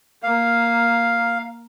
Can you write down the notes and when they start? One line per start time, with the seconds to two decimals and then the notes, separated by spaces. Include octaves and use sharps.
0.23 A#3 F5